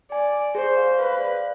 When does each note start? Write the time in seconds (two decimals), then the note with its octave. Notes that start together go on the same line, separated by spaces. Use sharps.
0.11 D5 G#5
0.33 G#5
0.55 G#4 C5
0.77 F5
0.99 B4 F5
1.20 D5